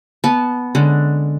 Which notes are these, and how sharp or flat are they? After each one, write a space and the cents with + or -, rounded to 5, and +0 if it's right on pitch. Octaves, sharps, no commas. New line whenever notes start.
B3 +0 A5 -25
D3 +0 G#3 +0 C#4 +0